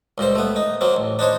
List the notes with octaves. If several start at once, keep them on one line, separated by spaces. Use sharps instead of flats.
C#2 A#2 G3 C5
A3 B3
D#4
F#3 A#3 C4
A1
D4 D#4 C5 C#5